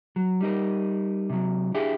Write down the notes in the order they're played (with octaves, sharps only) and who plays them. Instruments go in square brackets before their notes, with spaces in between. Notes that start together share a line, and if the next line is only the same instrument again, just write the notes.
[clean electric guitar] F#3
G3 D#4 A#4
C3 F#3
D4 E4 G4 G#4 F5 G5